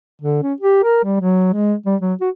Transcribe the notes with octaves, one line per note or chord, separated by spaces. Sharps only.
D3
C#4
G4
A#4
G3
F#3
G#3
G3
F#3
F#4